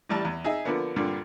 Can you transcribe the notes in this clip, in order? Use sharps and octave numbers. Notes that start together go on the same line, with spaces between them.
A1 G3 A5
E2
D#4 G#4 E5
D3 F3 A#3 B3
G2 A#2 D3